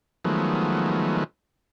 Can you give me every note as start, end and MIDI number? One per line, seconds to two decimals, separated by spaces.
0.25 1.24 51
0.25 1.24 53
0.25 1.24 54
0.25 1.24 56
0.25 1.24 57
0.25 1.24 59